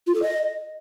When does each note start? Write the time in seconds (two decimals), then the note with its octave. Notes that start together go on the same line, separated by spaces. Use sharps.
0.06 F4
0.14 A4
0.22 D#5